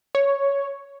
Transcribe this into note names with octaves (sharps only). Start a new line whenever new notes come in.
C#5